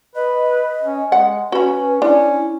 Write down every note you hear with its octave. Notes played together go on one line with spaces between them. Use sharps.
B4 D#5
C#4
G#3 F#5
C#4 F#4 B4 B5
C#4 D4 E4